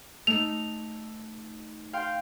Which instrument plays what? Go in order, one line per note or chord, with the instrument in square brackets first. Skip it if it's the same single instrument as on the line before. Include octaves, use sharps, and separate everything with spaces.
[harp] A3 D#4 [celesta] F7
[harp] F5 G5 C6